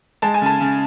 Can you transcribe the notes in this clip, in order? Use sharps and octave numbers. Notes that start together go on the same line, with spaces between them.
G#3 A5
G#5
C#3 A5
C#3